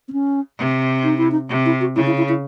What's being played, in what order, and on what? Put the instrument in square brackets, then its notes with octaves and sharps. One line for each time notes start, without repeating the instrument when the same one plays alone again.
[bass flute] C4
C#4
[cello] C3
[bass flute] D#4
E4
D#4
[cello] C3
[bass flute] E4
F#4
[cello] C#3 [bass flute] E4
[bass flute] E4
E4
E4